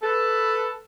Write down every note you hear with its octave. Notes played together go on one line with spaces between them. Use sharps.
A4 B4